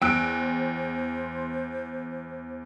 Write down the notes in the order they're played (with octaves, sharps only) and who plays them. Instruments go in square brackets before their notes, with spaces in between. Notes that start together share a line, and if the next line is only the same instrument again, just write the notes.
[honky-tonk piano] E2 D7 [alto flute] C5 [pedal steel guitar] G5 E6 F#6